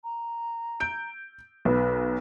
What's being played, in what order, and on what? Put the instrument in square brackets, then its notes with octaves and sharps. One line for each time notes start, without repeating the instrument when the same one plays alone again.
[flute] A#5
[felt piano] G6 D7
[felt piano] B1 [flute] B4